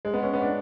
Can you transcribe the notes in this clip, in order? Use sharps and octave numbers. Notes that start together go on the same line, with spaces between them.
G#3
B3
C#4
B3
D4